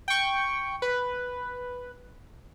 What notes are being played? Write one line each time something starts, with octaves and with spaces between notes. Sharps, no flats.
G5 C#6
B4